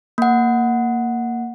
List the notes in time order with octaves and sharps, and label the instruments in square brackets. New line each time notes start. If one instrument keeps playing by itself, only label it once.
[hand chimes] A#3 F#5